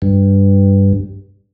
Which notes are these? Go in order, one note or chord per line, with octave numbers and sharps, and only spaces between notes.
G2